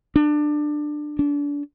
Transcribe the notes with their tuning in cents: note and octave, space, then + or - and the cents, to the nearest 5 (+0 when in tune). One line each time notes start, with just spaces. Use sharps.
D4 +20
D4 -30